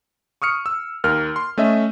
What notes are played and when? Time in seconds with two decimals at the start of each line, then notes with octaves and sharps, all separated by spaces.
0.42 C#6 D#6 F6 C#7
0.66 E6
1.04 D#2 A#4 F6
1.36 C6
1.58 A3 C#4 D#5 E5